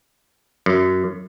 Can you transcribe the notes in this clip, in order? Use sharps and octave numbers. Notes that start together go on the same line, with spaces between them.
F#2